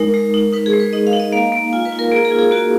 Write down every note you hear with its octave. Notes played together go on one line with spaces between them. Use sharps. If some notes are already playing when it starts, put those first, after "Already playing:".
Already playing: G#3 D#4 A#4
G#3
D#4
D#4 B4
G#4
G#3
B4
D#4 D#5
F5
D#4
D#5
A#3 F5
A#3
F4 G#5
B4
F4
A#4
A#3 G#4
G#4
F4
G#4
A#3 F#4